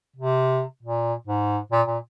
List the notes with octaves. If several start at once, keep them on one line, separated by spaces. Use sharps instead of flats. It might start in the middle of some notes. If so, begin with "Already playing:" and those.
C3
A#2
G#2
A#2
A#2